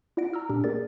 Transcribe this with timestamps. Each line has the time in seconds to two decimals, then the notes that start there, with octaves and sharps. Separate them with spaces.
0.17 E4 F4 D5 F#5 A#6 D7
0.33 A#5 E6 F6
0.49 A#2 D4 G4
0.64 A#3 G#4 A#4 D5 A6